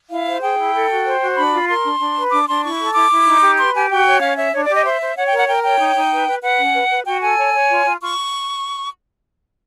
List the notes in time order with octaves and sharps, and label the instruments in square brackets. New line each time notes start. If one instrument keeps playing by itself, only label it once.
[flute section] E4 F5
C5
G#4 G5
E4
A4
F#4
C5
F#4
D4 B5
F4
A#4 C6
D4
D4
B4
D4 D6
D4 C6
E4 C#6
A4
E4 D6
E4
D#4
G4
B4 C6
G4 G#5
F#4 G5
C#5
C#4 F5
C#5 E5
D4 C#5
D5
G4
D#5
C5 E5
C5
C#5 F#5
G5
A#4
F#5
A#4 G5
C#5 G5
D#4
D#4
B4
B4
B4 F#5
C#4
B4
B4
F#4 G5
A4 G#5
C#5
C#5
F4
F4
F4 C#6